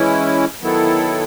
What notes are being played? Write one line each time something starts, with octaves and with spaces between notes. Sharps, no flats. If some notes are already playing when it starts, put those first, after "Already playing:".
Already playing: E3 G#3 C#4 E4
D#3 F#3 B3 E4 A4